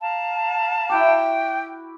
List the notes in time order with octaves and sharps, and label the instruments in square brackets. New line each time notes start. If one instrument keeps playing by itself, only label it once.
[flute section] F5 A5 A#5
[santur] E4 F#4 D6 [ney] G5